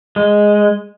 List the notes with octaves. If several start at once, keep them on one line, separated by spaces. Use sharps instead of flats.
G#3